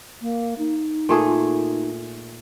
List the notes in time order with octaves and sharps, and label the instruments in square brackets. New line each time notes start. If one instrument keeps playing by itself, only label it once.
[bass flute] A#3
D#4
[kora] A#2 A3 G#4